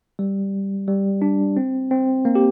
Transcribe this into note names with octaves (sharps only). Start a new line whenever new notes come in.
G3
G3
D4
C4
C4
A#3
G4